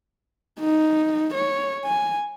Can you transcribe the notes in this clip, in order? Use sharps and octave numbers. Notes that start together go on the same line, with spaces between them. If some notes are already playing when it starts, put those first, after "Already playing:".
D#4
C#5
G#5